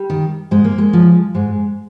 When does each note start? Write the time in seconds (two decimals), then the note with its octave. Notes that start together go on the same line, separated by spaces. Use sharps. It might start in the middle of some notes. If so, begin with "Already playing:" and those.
Already playing: G3
0.10 D#3
0.51 G#2 G#3
0.64 A#3
0.78 G#3
0.93 F3
1.35 G#2 G#3